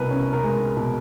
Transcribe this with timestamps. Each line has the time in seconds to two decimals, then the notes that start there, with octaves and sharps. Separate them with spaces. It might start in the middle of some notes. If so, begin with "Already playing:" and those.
Already playing: C2 B2 A#4 B4
0.11 C#4
0.33 A#4
0.44 G#3
0.77 B2